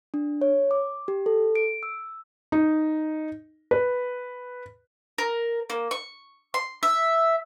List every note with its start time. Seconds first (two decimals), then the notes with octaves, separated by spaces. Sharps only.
0.14 D4
0.41 C#5
0.71 D6
1.08 G4
1.26 A4
1.55 D7
1.83 E6
2.52 D#4
3.71 B4
5.18 A#4
5.70 A#3
5.91 C#6
6.54 C6
6.83 E5